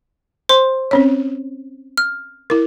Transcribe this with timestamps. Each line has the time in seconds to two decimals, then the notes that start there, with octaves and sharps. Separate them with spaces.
0.49 C5 C6
0.91 C4 C#4 C#5
1.98 F6
2.50 E4 A#4